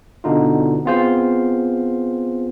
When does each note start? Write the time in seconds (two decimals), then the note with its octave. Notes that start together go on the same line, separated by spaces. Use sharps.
0.24 B2 D3 D#4 F4
0.85 B3 C4 F4 G#4 C5